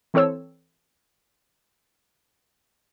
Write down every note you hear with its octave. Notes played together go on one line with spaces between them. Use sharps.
E3 C4 A4 C#5 E6